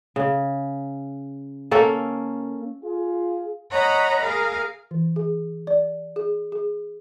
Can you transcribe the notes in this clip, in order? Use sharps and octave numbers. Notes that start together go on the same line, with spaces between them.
C#3
A#3 C#4 A4
F4 G#4
C#5 D#5 F#5 A#5 B5
G#4 A#4 F5
E3
G#4
D5
G#4
G#4